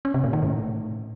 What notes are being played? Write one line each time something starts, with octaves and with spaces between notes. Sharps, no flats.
C#4
C3
A#2
D#3
A2